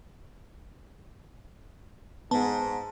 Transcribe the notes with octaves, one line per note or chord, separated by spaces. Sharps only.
G#2 B3 A5